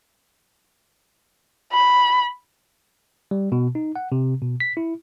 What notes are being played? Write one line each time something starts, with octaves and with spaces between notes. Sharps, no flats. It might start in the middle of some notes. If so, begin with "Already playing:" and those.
B5
G3
B2
D#4
F#5
C3
B2
B6
E4